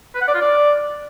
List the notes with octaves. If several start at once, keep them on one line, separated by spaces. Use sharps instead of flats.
B4
F#5
D5
F4
D5